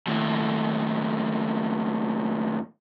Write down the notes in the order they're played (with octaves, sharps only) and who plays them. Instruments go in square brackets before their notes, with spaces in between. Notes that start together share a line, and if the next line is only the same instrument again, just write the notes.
[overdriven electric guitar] D#2 A2